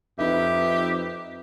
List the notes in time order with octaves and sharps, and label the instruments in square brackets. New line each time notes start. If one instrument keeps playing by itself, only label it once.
[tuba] F2 [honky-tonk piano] D#4 B4 [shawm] G4 [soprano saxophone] E5